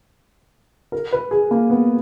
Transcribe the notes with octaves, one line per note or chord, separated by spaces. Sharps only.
A#4
B4
G#4
A#3
B3